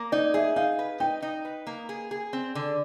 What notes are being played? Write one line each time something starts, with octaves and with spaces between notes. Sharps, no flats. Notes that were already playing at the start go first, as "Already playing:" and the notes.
Already playing: A#3
D#4 D5
G#4 E5
D#4 F5
B4
D#4 G5
D#4
B4
A#3
G#4
G#4
C4
D3